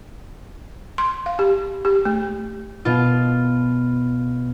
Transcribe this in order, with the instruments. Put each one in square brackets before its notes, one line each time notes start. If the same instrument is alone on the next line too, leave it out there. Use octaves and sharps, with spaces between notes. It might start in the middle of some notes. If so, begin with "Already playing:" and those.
[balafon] C6
F5
G4
G4
A3
[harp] B2 F4